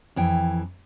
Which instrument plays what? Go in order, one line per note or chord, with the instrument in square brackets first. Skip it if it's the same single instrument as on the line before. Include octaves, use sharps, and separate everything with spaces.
[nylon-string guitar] F2 E3 G5